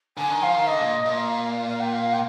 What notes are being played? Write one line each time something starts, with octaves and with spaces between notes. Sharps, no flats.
D3 G#5
D#3
F3 F5
D#3
D3 D#5
A#2
A#2
F5
F5
G5
F5
G5